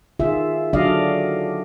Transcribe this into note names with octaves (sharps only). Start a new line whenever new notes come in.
D#3 F4 G#4 E5
D3 F#3 D4 D5 D#5 F5